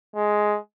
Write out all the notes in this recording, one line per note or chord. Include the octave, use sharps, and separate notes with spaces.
G#3